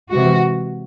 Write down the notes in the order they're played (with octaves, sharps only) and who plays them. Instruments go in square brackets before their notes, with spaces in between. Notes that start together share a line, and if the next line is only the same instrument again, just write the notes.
[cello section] C3 E3 G#3 F#4